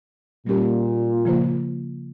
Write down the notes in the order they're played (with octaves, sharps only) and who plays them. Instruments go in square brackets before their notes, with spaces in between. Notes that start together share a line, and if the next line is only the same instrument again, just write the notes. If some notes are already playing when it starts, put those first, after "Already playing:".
[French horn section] A#2 [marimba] G3 A#3 C#4 G4 A#4
[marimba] C#3 F3 A#3 F4 C5